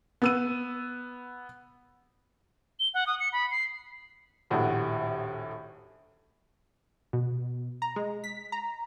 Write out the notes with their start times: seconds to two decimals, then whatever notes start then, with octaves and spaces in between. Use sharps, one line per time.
0.22 B3 E6 D#7
2.80 G7
2.94 F#5
3.07 D#6
3.20 C#7
3.33 B5
3.51 C7
4.50 D#1 A#1 A2 F#4 G4
7.13 B2
7.82 A#5
7.96 G#3
8.24 B6
8.52 A#5